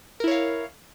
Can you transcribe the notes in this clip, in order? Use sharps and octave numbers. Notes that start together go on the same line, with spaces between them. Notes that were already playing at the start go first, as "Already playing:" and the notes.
E4 A#4 C#5 F5